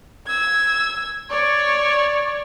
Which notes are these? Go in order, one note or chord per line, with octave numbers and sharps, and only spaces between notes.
E6 G#6
C#5 D5 C#6